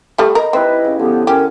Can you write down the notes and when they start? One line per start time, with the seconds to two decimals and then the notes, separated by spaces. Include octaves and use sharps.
0.18 G3 A3 B5
0.35 A#4 D#5
0.53 C4 D#4 E4 G4 B4
0.84 C#3
0.99 D3 F3 B3 G4
1.27 C#4 G4 A#4